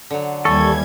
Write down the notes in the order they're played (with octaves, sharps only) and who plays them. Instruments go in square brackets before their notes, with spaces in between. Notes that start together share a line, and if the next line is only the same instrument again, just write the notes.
[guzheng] D3 F#3
[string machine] D#2 G3 G#6 [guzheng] E3 [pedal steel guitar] A4 [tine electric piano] C#6